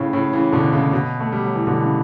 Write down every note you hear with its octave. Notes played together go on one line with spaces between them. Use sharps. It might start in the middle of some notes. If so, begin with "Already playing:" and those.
Already playing: A2 C#3
A2 C#3
C#3 E3
B2 D3
A2 C#3
B2
A3
G3
F#3
E3
B2 D3
C#3 E3